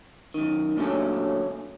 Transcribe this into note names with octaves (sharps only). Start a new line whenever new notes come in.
F#2 D#3
A#2 D3 F#3 A3 C#4